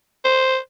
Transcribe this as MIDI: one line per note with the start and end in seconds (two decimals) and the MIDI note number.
0.25 0.57 72